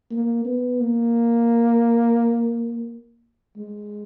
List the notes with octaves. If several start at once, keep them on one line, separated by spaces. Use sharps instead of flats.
A#3
B3
A#3
G#3